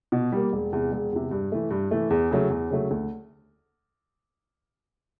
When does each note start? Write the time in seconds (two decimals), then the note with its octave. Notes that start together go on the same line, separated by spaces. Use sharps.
0.12 B2
0.32 G3 A#3
0.53 E1
0.73 E2 C3
0.92 E1
1.12 E2 C3
1.31 G2
1.52 E3 A3
1.71 G2
1.91 E3 A3
2.10 E2
2.31 C#3 F#3 A3
2.50 E2
2.70 C#3 F#3 A3
2.91 D2